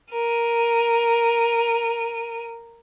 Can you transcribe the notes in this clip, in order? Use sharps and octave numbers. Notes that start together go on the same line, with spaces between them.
A#4 D#7